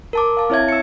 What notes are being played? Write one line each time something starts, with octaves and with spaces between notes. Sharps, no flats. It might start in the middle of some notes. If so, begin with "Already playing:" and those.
A#4 A5 D6
F5 A5
C4 E4 C#5 E5 G#6
E6 C#7